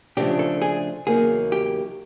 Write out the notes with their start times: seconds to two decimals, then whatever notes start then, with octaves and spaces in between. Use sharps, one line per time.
0.17 C#3 F3 A3 D4 G4
0.39 A4
0.62 G#4
1.07 E2 C#3 F#3 A#3 D#4 G#4
1.52 G4